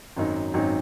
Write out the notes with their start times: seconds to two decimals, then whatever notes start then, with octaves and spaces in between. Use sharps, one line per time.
0.17 G#1 F#2 F#3 D#4
0.54 G#1 F#2 F#3 D#4